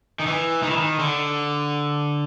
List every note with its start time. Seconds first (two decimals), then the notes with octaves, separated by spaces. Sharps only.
0.19 D#3
0.27 E3
0.63 D#3
0.70 E3
0.77 D#3
0.99 D3